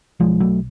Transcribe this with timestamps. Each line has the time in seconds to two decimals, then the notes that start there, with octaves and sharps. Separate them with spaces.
0.20 B1 F3 G#3
0.40 F#3 A3